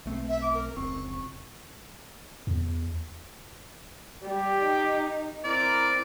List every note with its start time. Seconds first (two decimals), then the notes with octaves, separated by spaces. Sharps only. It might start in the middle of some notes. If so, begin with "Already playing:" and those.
0.06 B1 A3 C4
0.29 E5
0.42 D6
0.54 A#4
0.76 F1 C#2 C4 C#6
2.47 E2
4.23 G3 G4 G5
4.63 D#4
5.44 C4 E4 A#4 D5